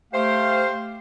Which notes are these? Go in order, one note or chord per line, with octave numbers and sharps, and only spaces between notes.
A3 G4 C5 F5